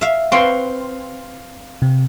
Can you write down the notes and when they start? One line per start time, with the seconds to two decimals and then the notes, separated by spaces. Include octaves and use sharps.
0.01 E5 F5
0.32 C4 B4 F5 C6 C#6
1.82 C3